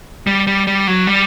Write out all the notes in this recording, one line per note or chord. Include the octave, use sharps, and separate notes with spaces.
G3
G3
G3
F#3
G3